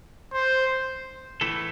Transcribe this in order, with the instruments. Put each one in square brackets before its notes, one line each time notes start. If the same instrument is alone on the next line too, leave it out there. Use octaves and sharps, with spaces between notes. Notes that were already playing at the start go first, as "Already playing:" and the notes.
[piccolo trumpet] C5
[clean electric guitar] A2 E3 A3 E4 A4